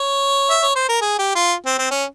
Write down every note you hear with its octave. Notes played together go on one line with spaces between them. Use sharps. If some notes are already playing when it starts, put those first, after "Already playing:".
Already playing: C#5
E5
C#5
C5
A#4
G#4
G4
F4
C4
C4
C#4